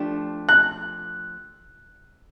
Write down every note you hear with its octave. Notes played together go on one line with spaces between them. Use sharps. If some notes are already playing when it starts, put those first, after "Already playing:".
Already playing: F3 A3 D4 G4
F#6